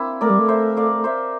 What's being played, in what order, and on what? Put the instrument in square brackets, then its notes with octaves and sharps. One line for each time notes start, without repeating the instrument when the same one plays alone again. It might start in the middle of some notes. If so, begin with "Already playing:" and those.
Already playing: [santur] A#3 C4 D4 E4
[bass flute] A3 [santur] A#4 D5
[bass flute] G3
A3
[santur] C5 E5
D5 F5
C5 E5